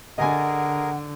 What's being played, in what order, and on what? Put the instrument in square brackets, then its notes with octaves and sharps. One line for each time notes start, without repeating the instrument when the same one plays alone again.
[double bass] D3 [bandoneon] G#4 A#4 [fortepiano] D#5 G#5 [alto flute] F#5